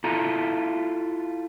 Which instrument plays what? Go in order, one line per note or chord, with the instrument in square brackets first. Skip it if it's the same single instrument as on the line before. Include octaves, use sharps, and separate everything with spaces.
[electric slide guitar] E4 F4 A4 A#5